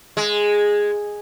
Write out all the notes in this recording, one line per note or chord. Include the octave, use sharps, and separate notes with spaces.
G#3